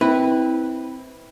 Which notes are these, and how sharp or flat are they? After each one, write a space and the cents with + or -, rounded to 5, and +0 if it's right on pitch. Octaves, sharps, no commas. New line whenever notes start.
C4 +0 E4 -25 B4 +0